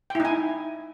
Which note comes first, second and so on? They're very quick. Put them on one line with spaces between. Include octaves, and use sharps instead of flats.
G5 E4 D#4 G#5